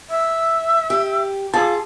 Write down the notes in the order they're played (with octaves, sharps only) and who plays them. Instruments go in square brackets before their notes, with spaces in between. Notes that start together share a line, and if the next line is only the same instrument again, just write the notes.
[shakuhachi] E5
[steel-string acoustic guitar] G4
[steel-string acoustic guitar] F4 [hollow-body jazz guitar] G#4 A5